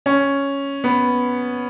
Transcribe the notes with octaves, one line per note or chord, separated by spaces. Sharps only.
C#4
B3